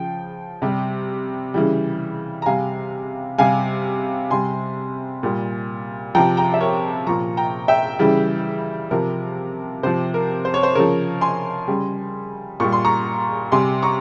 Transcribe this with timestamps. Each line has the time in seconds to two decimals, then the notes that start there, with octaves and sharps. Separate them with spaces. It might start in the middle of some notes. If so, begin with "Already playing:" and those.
Already playing: C#3 F3 G5
0.62 C3 G3
1.54 C#3 E3 G3
2.42 A#5
2.46 C3 G3 F5 G#5
3.38 C3 G3 F5 G#5
4.30 C3 G3 G#5 C6
5.23 A#2 G3
6.15 C3 F3 G5 A#5
6.37 G5 A#5
6.54 E5
6.61 A#4 C#5
7.07 A#2 F3 A#5 C#6
7.37 G5 A#5
7.68 E5 G5
7.99 C#3 E3 G3
8.91 C3 F3 A#4
9.83 C3 F3 C5
10.14 A#4
10.45 C5
10.54 C#5
10.63 C5
10.75 C#3 F3 A#4 C#5
11.21 G#5 C6
11.68 C#3 G3
12.60 A#2 G3 C#6
12.72 C6
12.85 A#5 C#6
13.52 C3 G3 G#5 C6
13.82 A#5 C#6